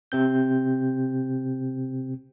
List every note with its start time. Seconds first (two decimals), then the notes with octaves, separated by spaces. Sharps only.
0.12 C3 C4 G6